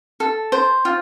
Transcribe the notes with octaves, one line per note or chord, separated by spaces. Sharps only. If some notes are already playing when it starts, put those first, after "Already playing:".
A4
C5
F4